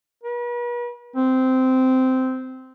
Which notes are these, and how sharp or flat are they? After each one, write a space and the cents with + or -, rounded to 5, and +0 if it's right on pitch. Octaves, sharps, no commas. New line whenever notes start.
B4 -40
C4 -15